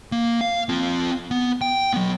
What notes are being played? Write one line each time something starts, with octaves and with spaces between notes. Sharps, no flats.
A#3
F5
C4 F4
B3
G5
F#3 B3